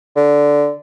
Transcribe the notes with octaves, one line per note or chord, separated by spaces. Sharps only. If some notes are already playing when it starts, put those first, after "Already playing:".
D3